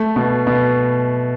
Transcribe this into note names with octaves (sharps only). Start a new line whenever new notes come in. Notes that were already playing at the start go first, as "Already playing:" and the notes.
Already playing: A3
B2
B2